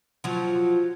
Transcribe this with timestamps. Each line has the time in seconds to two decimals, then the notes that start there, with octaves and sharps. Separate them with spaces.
0.24 F3 F#3